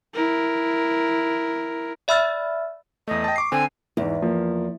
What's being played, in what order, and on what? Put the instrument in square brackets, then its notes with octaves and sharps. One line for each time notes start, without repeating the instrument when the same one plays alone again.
[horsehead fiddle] E4 A#4
[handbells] D5 E5 B5 E6 F6 A6
[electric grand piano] E2 A3 [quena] D#5
[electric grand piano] G5 A5
C#6 D6 C7
[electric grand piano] D3 C4 [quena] G#5
[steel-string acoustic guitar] E2 [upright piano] G#2 E3
[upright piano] F3 A#3